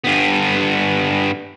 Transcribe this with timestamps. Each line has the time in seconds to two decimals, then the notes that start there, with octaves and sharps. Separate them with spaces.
0.04 G2 B3